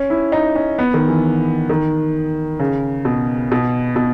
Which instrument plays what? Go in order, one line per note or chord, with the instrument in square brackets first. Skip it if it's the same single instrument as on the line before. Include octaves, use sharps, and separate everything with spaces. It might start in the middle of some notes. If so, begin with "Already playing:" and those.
Already playing: [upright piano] C#4
E4
D#4
C#4
B3
D#3
E3
D#3
C#3
B2
B2
B2